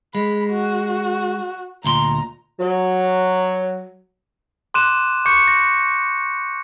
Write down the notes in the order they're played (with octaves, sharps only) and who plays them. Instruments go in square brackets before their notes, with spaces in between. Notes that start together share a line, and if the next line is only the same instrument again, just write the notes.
[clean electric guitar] G#3 [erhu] B5
[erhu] F#4
[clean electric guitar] D2 A#2 C6 [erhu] A#5
[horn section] F#3
[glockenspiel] C6 D6 F#6 D#7 E7
C#6 D6 G6 C#7
A#6